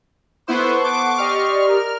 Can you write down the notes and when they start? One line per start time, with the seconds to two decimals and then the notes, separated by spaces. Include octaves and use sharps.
0.48 B3 E4 A4 C5 F#5 C6 C#6
0.84 D6
1.18 G4 D5 D#5 F6
1.66 A#4